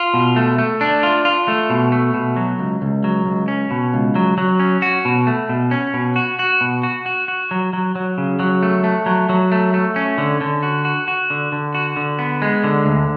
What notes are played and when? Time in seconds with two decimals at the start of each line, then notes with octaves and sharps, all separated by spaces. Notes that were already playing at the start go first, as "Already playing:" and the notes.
Already playing: F4
0.14 B2
0.36 A3
0.58 A3
0.81 D4
1.03 F4
1.25 F4
1.48 A3
1.70 B2
1.92 A3
2.14 B2
2.36 F#3
2.59 C#2
2.82 C#2
3.04 F#3
3.26 C#2
3.48 C#4
3.71 B2
3.94 C#2
4.15 F#3
4.38 F#3
4.60 C#4
4.82 F#4
5.05 B2
5.27 A3
5.49 B2
5.71 C#4
5.94 B2
6.16 F#4
6.39 F#4
6.61 B2
6.83 F#4
7.06 F#4
7.28 F#4
7.51 F#3
7.73 F#3
7.96 F#3
8.18 C#3
8.39 F#3
8.63 A3
8.84 A3
9.06 F#3
9.29 F#3
9.52 A3
9.74 A3
9.96 C#4
10.18 D3
10.41 D3
10.63 F#4
10.85 F#4
11.08 F#4
11.30 D3
11.52 D3
11.75 F#4
11.96 D3
12.19 B3
12.42 G#3
12.64 D3
12.86 D2